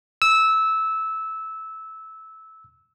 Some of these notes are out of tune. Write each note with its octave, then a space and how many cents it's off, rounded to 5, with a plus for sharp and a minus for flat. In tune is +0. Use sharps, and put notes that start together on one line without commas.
E6 -15